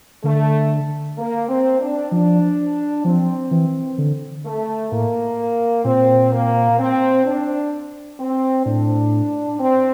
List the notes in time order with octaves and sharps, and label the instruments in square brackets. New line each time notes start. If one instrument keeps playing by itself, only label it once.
[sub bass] D3 [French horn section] A3
[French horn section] A#3
C4
D4
[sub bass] F3 [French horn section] D4
[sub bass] F3 [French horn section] C4
[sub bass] E3
D3
[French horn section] A3
[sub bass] A2 [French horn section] A#3
[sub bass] A#2 [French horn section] C4
[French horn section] A#3
C4
D4
C4
[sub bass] A2 [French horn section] D4
[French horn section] C4